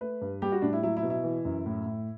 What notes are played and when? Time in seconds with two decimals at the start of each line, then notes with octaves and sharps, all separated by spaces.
0.01 A3 B4
0.21 G2
0.42 G3 G4
0.52 F#4
0.62 A2 D4
0.73 E4
0.83 F#3 E4
0.97 E4
1.03 B2
1.10 E4
1.24 E3
1.45 F#2
1.66 A2
1.86 A2